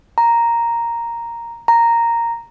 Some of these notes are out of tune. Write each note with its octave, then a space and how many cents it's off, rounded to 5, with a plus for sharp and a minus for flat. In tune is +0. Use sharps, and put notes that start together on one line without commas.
A#5 +0
A#5 -5